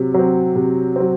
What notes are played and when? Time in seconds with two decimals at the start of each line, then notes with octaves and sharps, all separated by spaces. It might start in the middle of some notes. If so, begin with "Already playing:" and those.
Already playing: C3 F#3
0.14 F#3 C4
0.56 C3
0.96 F#3 C4